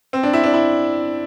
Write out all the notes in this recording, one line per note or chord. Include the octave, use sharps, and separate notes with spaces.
C4
D4
E4
D4
E4